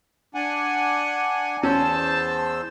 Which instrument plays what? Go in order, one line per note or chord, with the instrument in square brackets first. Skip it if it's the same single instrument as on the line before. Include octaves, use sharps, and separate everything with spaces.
[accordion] D4 F#5 G#5
[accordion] E2 C5 E6 [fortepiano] C#4 [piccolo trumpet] A5